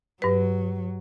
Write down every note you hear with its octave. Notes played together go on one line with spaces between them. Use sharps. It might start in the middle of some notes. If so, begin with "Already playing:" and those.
G2 F#3 B4